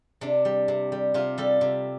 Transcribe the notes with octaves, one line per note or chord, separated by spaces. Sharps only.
C3 D4
G3
C3
G3
C3 F4
G3 A4
C3